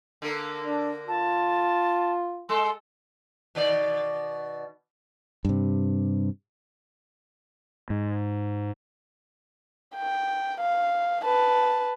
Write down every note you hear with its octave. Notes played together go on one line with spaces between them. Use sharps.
D3 A#3 A#4
D4
F4 A5
G#3 A4 C6
B2 D#3 D5
G2 C3
G#2
G5
F5
B4 A5